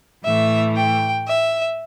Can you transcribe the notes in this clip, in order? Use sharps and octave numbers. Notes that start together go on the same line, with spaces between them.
A2 E3 A3 E5
G5
E5